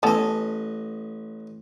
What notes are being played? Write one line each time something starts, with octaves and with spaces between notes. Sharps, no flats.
A1 B3 C#4 A4 D#5